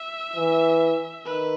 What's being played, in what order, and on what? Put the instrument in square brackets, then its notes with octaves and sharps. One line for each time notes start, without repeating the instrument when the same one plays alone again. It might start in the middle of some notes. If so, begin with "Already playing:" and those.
Already playing: [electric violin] E5
[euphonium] E3
[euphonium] D#3 [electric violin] B4